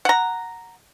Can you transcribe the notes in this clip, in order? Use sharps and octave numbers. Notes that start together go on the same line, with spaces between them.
F#5 A#5